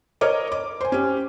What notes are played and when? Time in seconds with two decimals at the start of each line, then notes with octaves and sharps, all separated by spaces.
0.21 A#4 C#5 D#5 D6
0.52 D6
0.81 C5 G#5
0.92 C#4 G4